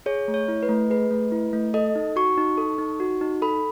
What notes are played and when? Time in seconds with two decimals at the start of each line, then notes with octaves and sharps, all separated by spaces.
0.06 G#4 C#5
0.28 A3
0.34 C#5
0.48 E4
0.63 B4
0.69 A3
0.90 G#4 B4
1.11 A3
1.32 E4
1.53 A3
1.74 A4 D#5
1.95 D#4
2.16 F#4 C#6
2.38 D#4
2.58 A4
2.78 D#4
3.00 F#4
3.21 D#4
3.42 A4 B5